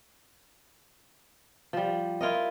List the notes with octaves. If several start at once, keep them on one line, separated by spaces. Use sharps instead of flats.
F3 G3
E4 F4 A#4 D#5